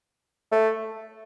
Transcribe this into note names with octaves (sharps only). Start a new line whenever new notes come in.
A3